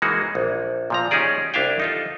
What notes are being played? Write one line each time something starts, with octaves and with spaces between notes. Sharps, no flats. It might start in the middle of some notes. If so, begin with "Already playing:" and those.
E3 G#3 A#3 D#4 F#4
A#1
A#2 F3 A#5
C#4 D#4 G4 G#4 D5
C2 D4 E4 E5 F5 G5
D#4 F4 A4